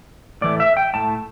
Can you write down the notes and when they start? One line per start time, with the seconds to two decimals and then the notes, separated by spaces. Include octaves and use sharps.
0.41 A2 E3 A3 D5
0.60 E5
0.77 G5
0.94 A2 A3 A5